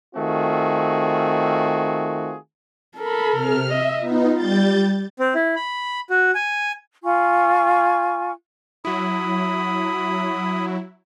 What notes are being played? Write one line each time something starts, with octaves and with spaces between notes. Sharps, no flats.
D#3 A3 C4 F4 F#4 G#4
A4 A#4 B5
C3 F6
D#5 E5
B3 D#4 F4
G3 G6 A6
C4
E4
B5
F#4
G#5
F4 G#5 C#6
F#3 E4 B5 D#6